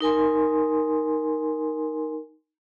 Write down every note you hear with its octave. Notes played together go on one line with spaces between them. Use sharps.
D#4 A#4 G#5 C6